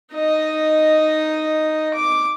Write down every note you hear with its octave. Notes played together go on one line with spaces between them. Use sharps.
D#4 D#5
D6